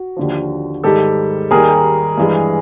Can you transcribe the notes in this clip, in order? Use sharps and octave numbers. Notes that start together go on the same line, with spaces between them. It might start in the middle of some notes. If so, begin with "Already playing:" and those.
Already playing: F#4
D#2 D3 F3
G#2 D#3 G3 G4 A4
D#2 D#3 G3 G#4 A#4
G2 E3 G#3